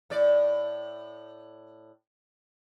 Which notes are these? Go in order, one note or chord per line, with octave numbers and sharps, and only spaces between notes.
A2 D5